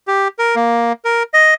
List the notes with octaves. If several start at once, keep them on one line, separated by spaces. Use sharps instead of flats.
G4
A#4
A#3
A#4
D#5